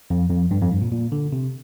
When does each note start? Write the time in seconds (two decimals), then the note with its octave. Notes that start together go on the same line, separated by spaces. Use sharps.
0.10 F2
0.30 F2
0.51 G2
0.61 F2
0.72 G2
0.82 A#2
0.92 A#2
1.12 D3
1.33 C3